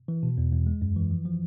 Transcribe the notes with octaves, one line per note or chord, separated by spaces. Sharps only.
E3
B2
E2
E2
G#3
F#2
E3
F3
F3